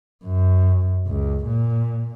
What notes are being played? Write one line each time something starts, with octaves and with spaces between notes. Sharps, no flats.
F#2
C#2
A#2